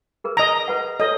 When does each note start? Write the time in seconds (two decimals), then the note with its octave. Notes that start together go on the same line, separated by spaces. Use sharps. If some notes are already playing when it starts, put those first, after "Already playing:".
0.24 G#4 A#4 B4
0.37 D#5 A#5
0.68 B4 F#5
1.00 A4 C#5 D#5